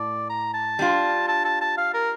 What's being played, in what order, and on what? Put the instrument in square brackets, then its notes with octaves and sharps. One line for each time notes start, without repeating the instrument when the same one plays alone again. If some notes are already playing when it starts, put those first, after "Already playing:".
Already playing: [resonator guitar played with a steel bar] A2 [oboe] D5
[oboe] A#5
A5
[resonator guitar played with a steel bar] G3 D4 F4
[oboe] A5
A5
A5
F5
A#4